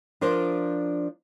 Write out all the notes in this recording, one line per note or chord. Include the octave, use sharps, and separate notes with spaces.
F3 D4 F4 A#4 C5